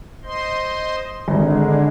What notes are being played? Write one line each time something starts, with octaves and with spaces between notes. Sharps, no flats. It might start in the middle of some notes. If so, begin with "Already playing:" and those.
C5 D#5 C6
G#1 D3 G#3